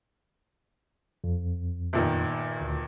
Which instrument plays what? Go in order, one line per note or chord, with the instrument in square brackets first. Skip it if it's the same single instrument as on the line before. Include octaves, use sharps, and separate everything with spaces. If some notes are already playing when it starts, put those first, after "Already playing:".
[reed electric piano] F2
[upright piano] G1 A#2 D#3
[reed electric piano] D2